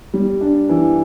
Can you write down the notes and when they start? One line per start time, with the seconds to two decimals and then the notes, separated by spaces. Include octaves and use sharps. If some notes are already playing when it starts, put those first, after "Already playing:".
0.13 G3
0.41 D4
0.69 E3